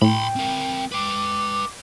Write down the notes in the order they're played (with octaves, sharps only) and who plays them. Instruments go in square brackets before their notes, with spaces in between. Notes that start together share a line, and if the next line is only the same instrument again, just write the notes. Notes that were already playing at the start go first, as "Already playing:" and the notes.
[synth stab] A2 [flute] G5 [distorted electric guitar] B5 C6
[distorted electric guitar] C4 A#4
[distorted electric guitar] B4 G5 [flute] D6